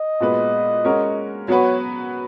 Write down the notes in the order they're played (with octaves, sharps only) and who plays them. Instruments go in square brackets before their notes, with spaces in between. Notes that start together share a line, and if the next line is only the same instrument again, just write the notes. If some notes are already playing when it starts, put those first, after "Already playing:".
Already playing: [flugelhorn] D#5
[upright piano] A#2 G#3 B3 F#4 B4
G#3 C#4 F#4 A#4 C#5
[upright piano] F#3 B3 F#4 B4 [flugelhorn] C#5